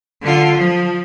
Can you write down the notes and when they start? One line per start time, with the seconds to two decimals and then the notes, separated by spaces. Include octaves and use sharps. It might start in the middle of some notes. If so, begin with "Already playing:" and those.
0.22 D3 F4
0.57 F3